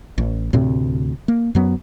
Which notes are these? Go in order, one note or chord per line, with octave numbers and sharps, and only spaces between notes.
A1
D2 A2 C3 C4
A#3
F#2 F#3 B3